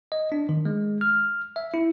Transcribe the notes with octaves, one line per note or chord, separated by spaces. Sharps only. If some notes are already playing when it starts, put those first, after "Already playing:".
D#5
D4
D#3
G#3
F6
E5
E4